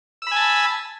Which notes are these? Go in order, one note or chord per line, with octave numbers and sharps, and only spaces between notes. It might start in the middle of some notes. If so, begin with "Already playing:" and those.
G#5 A5 B5 E6